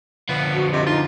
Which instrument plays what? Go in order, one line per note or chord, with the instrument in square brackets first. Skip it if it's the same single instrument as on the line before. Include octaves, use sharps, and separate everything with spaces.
[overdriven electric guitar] D3 F3 [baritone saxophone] B3
[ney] F#4
[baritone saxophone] C3 [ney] D#5
[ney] D#4 [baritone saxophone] F4